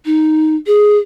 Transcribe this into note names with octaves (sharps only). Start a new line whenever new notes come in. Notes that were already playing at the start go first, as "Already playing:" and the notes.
D#4
G#4